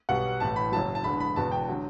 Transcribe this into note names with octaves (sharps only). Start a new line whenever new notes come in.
B1 B2 G3 F#5
A1 A2 E3 A5
B5
F#1 F#2 F#3 A5
A5
E1 E2 D3 B5
B5
E1 E2 B2 A5
G5
D3 F#3